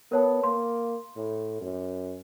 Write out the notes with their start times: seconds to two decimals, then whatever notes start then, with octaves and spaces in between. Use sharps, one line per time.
0.12 B3 A#4 C#5 A5
0.43 A#3 C6
1.16 A2
1.61 F#2